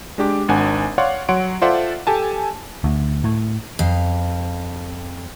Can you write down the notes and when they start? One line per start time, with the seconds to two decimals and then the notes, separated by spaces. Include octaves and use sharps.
0.18 G#3 D4 G4 D6
0.49 G#1 D4 F#5 G#5
0.98 C#5 D5 F5 F#5 C6
1.29 F#3 C#5 F#5 C6 D7
1.62 F4 A4 C5 D5 E5 F#5
2.07 G4 A4 G#5 A5
2.84 D2
3.24 A2
3.79 F2 F5